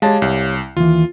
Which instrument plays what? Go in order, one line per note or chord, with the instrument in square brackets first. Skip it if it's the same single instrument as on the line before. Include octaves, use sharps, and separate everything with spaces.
[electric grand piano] G#3 A5 [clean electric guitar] G4 C#5 F5
[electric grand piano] C2
[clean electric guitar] D#2 E3 [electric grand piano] F4